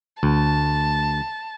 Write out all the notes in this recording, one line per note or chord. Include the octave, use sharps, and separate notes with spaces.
D2 A5